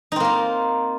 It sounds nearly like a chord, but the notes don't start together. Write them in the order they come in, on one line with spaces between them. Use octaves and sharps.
D#4 C4 A#3 F4